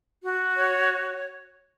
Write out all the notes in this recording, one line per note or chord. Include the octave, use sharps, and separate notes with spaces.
F#4
C#5
C#5